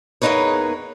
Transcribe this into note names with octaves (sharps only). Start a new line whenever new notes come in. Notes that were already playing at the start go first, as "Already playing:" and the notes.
E2 G#3 A#3 D#4 B4 C#5